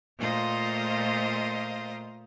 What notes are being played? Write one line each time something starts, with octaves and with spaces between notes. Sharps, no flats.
A#2 A3 F4 C5 D#5 A#5